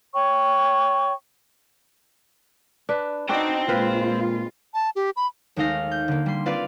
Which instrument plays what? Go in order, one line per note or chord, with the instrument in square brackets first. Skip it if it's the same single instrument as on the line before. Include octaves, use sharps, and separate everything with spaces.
[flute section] C#5 G5 C#6
[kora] D4 B4
[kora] D4 F#4 D5 [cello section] D#4 [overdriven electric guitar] C5 G5
[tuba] A#2 [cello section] G#3 F4 [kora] C4 B4 F5
[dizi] A5
G4
B5
[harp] D#2 G#3 A3 D#4 F5 A#6
G6
D3 A#3
G3 C6
C4 F4 B4 D5 F5